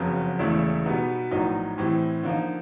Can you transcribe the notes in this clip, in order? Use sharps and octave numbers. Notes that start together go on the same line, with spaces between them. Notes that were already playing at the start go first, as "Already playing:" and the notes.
Already playing: F#1 F2 C#3 F#3 B3
E1 E2 C#3 E3 A3
B2 G3 B3 D#4
A#1 A2 F#3 B3 D#4
A2 E3 G3 C4
D3 F3 A#3 D#4